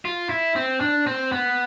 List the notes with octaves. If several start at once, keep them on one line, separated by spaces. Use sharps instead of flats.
F4
E4
C4
D4
C4
B3